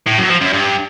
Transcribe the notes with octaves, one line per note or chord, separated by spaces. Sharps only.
A2
F#2
F3
F#2
G2